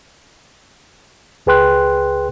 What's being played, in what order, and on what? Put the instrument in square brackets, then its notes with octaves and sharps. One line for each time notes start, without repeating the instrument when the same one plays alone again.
[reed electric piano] C#2 G#4 B4 G5 C6 F#6